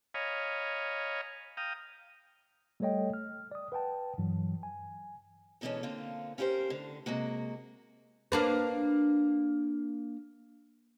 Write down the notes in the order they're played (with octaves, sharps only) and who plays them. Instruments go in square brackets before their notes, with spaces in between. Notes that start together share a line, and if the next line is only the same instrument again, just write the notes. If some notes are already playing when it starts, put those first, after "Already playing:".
[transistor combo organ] C#5 D#5 F5 G#5 A#5 B5
F5 G5 A#5 D#6
[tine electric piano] G3 A3 A4 C#5 D#5 G5
F6
D5 D#6
B4 F#5 G5 A5
G2 E3 F#3
G#5
[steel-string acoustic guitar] G#2 B2 D3 E3 B3 C#4
D3 A#3 C4 F4
C#4 E4 G4 A#4 C5
A2 D3
C3 G#3 A#3 F#4
[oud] A#3 D4 B4